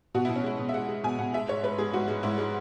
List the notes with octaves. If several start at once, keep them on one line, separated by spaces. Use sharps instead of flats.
B2 F#4
B2 E4
C#4
G#3 E4
B2
E5
G#3 F#5
G#3
B2 G#5
B2 F#5
G#3 E5
G#2 C#5
G#3 B4
G#3 G#4
G#2 F#4
G#3
G#2 E4
G#3